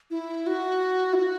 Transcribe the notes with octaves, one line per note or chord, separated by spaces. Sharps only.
E4
F#4
E4
F#4